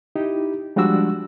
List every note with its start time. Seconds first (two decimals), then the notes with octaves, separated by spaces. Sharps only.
0.16 D#4 E4 G4
0.76 F3 G3 G#3 D4 F#4 E6